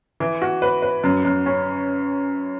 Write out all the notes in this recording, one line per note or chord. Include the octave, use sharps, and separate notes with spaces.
E3
F#4
B4
B4
F#2
F#2
C#4